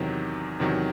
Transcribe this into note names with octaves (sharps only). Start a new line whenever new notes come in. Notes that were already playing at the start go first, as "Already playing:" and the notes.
Already playing: E2 C3 D#3 F#3
E2 C3 D#3 F#3